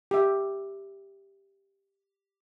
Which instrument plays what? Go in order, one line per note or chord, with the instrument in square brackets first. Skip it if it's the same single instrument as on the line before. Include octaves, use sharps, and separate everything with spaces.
[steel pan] G4 E5